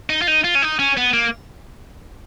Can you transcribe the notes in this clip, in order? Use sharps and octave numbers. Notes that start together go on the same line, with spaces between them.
D#4
F4
D#4
F4
C#4
D#4
C#4
B3
A#3